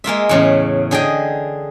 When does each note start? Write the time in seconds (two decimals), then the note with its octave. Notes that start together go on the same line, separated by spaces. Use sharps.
0.04 G#3 A#3 F4 E5
0.29 E2 A2 C#3
0.91 D3 G#4 D#5 G5